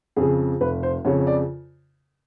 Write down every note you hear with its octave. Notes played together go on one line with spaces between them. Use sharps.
F2 C#3 G#4
F1 B4
C5
F2 C#3 C#5
C#5
D5